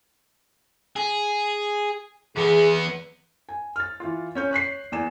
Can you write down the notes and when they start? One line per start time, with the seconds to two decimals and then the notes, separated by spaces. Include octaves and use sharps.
0.96 G#4
2.36 E2 B3 G#4
3.49 G#5
3.76 F6 A6
4.00 E3 F4
4.35 C#4 C#5 G6
4.51 C#5 F#6 B6 C7
4.92 E2 G#5 E7